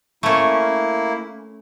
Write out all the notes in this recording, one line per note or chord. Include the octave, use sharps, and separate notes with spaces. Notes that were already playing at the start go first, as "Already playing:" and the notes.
A3 A#3 C#4 E4